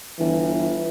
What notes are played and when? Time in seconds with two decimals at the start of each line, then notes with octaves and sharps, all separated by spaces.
0.19 G1 E3